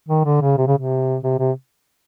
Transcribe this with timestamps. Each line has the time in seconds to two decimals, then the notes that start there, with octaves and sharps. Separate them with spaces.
0.08 D#3
0.25 D3
0.41 C#3
0.57 C3
0.67 C#3
0.77 C3
1.23 C3
1.38 C3